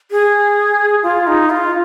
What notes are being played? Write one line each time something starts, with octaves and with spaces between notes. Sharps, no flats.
G#4
F4
D#4
F4